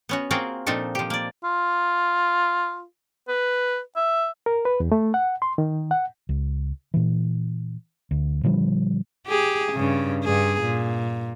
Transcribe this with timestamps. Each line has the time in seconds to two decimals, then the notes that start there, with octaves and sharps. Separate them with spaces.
0.09 B3 C#4 F#4
0.31 A#3 C4 F4 F#4 G#4 A#4
0.67 A#2 F3 C4 D4 D#4 A4
0.95 F3 G4
1.10 A#3 D5
1.44 F4
3.28 B4
3.96 E5
4.46 A#4
4.65 B4
4.80 E2
4.92 A3
5.14 F#5
5.42 C6
5.58 D#3
5.91 F#5
6.29 C#2
6.94 A#2 E3
8.11 D2
8.43 A#2 D3 F3 G3
9.27 G4 G#4
9.73 G2 C#3
10.24 G2 G#4
10.62 A#2